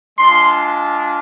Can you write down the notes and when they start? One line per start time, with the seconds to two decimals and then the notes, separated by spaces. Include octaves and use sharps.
0.18 G#3 D4 F4 C6